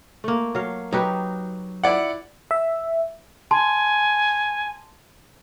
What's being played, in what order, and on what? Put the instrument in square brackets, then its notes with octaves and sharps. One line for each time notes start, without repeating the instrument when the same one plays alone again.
[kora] A3 A#3
F#3 F5
[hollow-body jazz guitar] F#3 [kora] D#4 G4 B4
[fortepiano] E4 D5 F#5
[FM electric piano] E5
[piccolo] G#5 [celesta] A5 C6